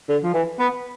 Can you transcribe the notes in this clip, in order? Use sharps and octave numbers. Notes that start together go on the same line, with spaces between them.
D3
F3
E3
B3